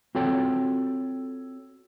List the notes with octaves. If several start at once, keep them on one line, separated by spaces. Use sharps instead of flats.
C4 F4 F#4 A4 C#5 G5